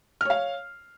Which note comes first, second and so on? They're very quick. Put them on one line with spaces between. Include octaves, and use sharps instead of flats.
F6 C#5 F5